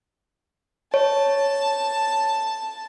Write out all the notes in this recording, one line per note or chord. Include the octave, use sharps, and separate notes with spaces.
C#5 A5